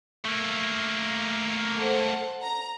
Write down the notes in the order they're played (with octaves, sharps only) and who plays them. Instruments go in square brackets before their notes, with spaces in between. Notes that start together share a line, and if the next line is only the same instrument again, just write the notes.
[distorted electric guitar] A3 A#3
[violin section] A4 C5 F#5
A#5